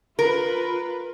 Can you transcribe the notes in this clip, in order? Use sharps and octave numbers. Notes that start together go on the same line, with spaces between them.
F4 A#4 B4